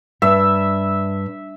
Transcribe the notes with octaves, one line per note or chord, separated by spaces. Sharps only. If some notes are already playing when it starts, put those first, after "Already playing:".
G2 E5